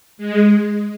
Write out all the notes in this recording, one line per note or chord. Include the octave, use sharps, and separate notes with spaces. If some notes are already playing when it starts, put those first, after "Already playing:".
G#3